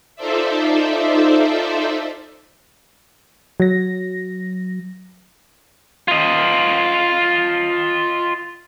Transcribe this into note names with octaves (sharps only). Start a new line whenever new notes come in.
D#4 F4 A4 C5 D5 E5
F#3 A#6
F4 D#5